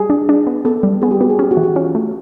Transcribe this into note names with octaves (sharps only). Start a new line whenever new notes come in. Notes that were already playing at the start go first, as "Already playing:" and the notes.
Already playing: G3 G#4
D4
D4
B3
B3 A4
G3
B3 G#4
G4
B3 F#4
G#4
C#4 G4
F#4
E3
F#4
C#4 F4
A3